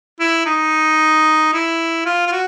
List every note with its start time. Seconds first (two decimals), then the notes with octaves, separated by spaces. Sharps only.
0.20 E4
0.46 D#4
1.53 E4
2.05 F4
2.27 F4
2.32 F#4